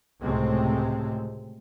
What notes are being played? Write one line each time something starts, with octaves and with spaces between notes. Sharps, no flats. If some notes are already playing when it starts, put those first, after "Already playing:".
C#2 A2 C3 G#3 A3 C4